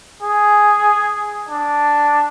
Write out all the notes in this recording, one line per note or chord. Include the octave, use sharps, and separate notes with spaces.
G#4
D4